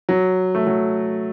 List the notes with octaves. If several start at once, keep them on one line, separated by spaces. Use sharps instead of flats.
F#3
A3
F#3